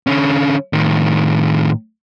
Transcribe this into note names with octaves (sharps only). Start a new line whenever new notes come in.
D3 C#4
A2 D#3